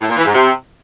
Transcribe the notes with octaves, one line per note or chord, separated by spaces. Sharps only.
A2
A#2
E3
G#2
C3